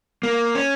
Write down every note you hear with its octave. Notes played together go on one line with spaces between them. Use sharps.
A#3
C#4